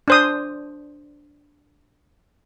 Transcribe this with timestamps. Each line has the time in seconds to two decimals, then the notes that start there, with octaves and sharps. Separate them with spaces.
0.08 D4 C5 D#6